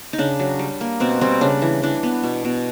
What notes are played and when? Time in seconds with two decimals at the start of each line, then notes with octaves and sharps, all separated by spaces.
0.13 D#4
0.18 C#3 D4
0.40 F#3
0.59 G3
0.81 A#3
1.00 B2 C4
1.21 G3 C4
1.41 C#3 D4
1.62 E3
1.83 E3 D4
2.03 B3
2.23 B2
2.45 B2